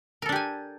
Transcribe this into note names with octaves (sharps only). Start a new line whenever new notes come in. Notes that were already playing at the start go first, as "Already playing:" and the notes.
D4 G4 A4 A#4 G#5